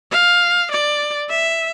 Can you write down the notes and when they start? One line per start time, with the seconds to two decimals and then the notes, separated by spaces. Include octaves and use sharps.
0.11 F5
0.72 D5
1.30 E5